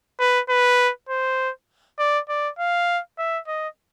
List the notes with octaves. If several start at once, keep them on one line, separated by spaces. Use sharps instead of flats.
B4
B4
C5
D5
D5
F5
E5
D#5